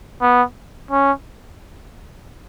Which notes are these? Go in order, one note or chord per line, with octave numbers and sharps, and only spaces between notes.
B3
C#4